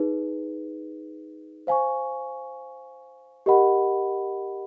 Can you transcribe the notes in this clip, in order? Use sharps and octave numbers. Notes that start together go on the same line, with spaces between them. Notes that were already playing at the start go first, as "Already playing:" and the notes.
Already playing: D#4 G#4 B4
C5 F5 G#5 C#6
G4 A#4 D#5 F#5 B5